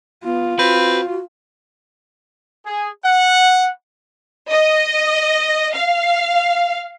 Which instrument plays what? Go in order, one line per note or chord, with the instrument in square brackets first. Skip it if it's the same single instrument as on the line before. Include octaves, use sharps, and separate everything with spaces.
[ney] B3 [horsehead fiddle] F4
[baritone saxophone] C4 [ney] F#4 [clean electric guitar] B4
[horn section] G#4
F#5
[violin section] D#5
F5